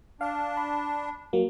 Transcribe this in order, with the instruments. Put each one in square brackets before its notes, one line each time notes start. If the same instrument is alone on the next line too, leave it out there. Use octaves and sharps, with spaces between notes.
[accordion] D4 [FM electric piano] F5
[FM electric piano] B5
F#3 A#3